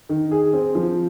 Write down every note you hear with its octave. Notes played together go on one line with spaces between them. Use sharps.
D#3
G#4
C4
F3